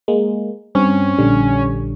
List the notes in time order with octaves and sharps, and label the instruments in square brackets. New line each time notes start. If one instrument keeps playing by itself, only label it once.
[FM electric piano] G#3 A#3
[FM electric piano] G2 C4 [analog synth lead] C#4
[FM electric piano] A#1 D3 G3